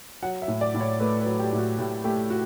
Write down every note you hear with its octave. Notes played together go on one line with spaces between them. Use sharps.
F#3 F#5
E5
A2
D5
A2
C#5
A3 B4
B4
F#3
G4
A2
F#4
A2 G4
A3 G4
F#4